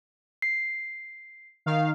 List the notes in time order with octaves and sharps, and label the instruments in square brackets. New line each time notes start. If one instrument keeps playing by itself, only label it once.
[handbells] C7
[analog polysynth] D#3 F5